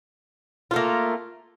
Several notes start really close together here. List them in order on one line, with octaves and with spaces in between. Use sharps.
F4 A3 A#3